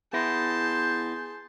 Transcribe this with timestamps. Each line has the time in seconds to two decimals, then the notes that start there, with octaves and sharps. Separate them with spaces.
0.13 B3 E4 G#4 A5 C6 G6 A#6